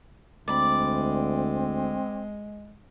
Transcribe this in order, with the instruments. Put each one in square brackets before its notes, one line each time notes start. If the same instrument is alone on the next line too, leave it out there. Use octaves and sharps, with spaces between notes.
[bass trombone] D2 [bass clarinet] G#3 [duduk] C4 [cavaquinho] D5 B5